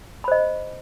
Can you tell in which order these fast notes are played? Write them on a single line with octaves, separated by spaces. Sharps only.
B5 C5 D#5